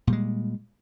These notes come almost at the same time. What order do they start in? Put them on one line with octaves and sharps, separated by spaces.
A#2 G3 G#3